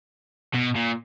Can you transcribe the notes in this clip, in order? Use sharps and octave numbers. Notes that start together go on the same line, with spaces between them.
B2
A#2